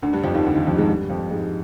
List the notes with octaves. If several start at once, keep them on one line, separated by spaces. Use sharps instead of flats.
D2 D3
G2 G3
F2 F3
D#2 D#3
D2 D3
D#2 D#3
F2 F3
G#2 G#3
G2 G3
F2 F3
G#2 G#3